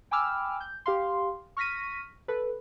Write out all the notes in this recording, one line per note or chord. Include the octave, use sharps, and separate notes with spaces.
G5 G#5 B5 D6 E6 F6
G6
G4 F5 C6
C#6 F6 A#6 B6 D#7
A4 B4